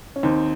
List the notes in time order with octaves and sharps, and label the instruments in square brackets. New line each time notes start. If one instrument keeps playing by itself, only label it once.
[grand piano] C#4
[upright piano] D#2 [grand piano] C4 D#4